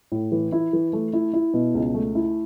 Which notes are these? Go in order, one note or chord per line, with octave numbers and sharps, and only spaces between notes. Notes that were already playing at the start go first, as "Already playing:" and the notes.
A2
E3
E4
E3
A3
E4
E4
B2
C#2
A3
E4